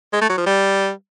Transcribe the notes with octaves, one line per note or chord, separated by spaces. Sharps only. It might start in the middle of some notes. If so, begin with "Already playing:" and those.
G#3
A3
F#3
F3
G3